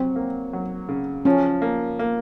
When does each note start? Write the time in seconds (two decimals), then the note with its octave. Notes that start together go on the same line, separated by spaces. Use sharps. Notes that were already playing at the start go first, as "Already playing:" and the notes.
Already playing: F#3 C4
0.16 A#3
0.53 F#3
0.89 C#3
1.25 F3 C#4
1.62 A#3
1.99 A#3